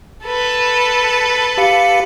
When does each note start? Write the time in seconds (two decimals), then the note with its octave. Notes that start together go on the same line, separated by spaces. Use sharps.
0.25 A4 B4
1.58 G4 F5 C#7